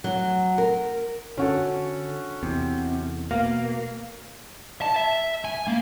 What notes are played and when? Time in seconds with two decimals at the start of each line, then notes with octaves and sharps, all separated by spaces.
0.04 F#3
0.58 A#4
1.37 D3 C#4 F#4 A4
2.43 E2 C3
3.31 B2 A#3 F5
4.82 A5
4.96 E5
5.45 G#5
5.68 A#3